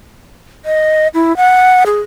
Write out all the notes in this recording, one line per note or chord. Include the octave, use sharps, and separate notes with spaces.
D#5
E4
F#5
G#4